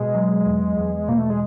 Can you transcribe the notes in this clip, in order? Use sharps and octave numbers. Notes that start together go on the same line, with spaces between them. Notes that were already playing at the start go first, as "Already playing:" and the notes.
Already playing: B2 G#3
F#3
E2
E2
B2 A#3
A3
G#3